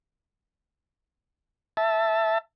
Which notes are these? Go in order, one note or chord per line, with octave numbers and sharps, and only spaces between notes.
E5 A5